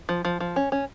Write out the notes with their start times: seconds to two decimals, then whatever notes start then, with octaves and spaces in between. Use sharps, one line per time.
0.09 F3
0.25 F3
0.40 F3
0.56 C#4
0.72 C#4